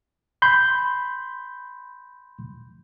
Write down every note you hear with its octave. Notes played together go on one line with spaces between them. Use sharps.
B5 C6 G6